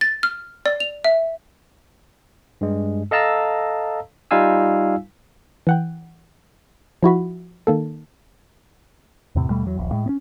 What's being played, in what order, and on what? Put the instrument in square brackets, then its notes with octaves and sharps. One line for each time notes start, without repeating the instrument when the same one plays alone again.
[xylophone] A6
F6
D5
F7
E5
[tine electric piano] G2 G#3
A4 D#5 F5 A5 A#5 E6
G3 D#4 F4 F5 G#5 E6
[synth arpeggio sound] E3 F#5 G5
F3 E4 F#4 B5
D#3 A#3 A4
[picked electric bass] E2 A2 C3
D#2 B2 G3 A3
E2 F#3
D#1 A#1
A2 G#3
B3 C#4